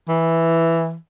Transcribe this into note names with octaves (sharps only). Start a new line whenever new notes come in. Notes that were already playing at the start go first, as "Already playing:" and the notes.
E3